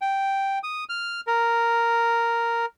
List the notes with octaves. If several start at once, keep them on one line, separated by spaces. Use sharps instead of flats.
G5
D#6
F6
A#4